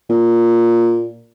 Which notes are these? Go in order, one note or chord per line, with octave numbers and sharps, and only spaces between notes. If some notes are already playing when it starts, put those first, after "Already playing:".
A#2